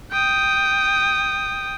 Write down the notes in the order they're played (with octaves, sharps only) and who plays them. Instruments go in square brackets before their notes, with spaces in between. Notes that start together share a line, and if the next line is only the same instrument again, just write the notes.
[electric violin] G5 D#6